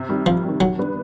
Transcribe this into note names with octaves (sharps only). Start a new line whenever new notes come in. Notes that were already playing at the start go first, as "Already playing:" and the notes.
Already playing: C3
D#3 G3
C3 F3
D#3 G3
D#3 F#3
G3 B3 D4